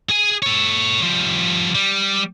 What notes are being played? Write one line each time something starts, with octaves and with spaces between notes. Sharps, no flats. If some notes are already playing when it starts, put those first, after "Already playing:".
G#4 G#5
A4 C#5
F3 G3
G3